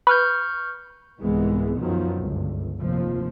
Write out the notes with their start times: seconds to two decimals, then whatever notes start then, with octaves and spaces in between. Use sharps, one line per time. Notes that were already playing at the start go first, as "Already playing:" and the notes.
0.07 B4 C#6 F6 G6
1.20 C2 G#2 E3 G#3 B3
1.80 F#2 D#3 F3 F#3 B3
2.19 G1 C#2
2.81 F1 D#2 F3